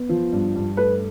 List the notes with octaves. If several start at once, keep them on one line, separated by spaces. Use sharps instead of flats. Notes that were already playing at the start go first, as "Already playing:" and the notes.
Already playing: B3
F3
G2
G2
A3 B4